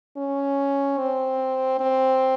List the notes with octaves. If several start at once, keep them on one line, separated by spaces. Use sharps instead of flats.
C#4
C4
C4